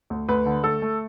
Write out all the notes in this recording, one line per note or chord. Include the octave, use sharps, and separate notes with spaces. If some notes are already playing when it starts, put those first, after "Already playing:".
D2
D2 B4
D3
A3 A4
A3